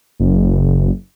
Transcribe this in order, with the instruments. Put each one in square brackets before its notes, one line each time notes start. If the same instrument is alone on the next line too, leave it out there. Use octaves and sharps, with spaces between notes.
[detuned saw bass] F#1